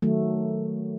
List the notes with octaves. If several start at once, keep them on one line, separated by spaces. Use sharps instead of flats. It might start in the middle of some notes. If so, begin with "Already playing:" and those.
D#3 F#3 A3